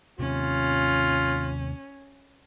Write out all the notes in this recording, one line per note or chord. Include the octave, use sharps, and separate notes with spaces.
D#2 C3 C#4 F4